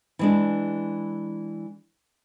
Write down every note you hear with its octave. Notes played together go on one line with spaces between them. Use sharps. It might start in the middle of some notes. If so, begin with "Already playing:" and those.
E3 G#3 D4